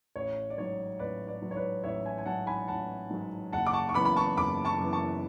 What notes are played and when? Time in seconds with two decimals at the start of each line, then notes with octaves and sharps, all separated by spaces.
0.16 A1 C#5
0.50 D5
0.57 G#2 F#3 C#5
0.99 A1 B4 D5
1.27 B4 D5
1.42 G#2 F#3
1.51 C#5
1.57 B4 D5
1.83 A1 C#5 E5
2.05 E5 G#5
2.18 G#5
2.26 G#2 F#3 F#5 A5
2.47 G#5 B5
2.68 A1 F#5 A5
3.11 G#2 F#3
3.52 F#1 F#5 A5
3.66 D6
3.73 A5 C#6
3.89 C#6
3.94 F#2 E3 B3 B5 D6
4.05 B5
4.16 A5 C#6
4.37 F#1 B5 D6
4.65 A5 C#6
4.79 F#2 E3 B3
4.93 A5 C#6